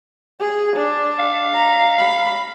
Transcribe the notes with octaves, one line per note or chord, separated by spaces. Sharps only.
G#4
D4
F5
A#5
B5